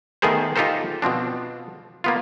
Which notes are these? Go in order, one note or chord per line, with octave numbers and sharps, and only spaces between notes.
D#3 A3 B3 G#4 A#4 C5
D#4 F4 G4 A4 A#4 C5
B2 F3 C4 D4
A#3 B3 F4